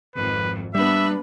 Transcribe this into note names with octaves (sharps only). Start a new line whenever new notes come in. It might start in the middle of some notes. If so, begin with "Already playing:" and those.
G#1 F2 B4
G3 A#3 B3 D4 B4 E5